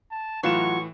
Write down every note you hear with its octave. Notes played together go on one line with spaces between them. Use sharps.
A5
A2 E3 F#3 F4 C#6 E7